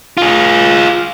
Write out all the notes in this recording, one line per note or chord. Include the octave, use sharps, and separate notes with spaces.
F4 G#4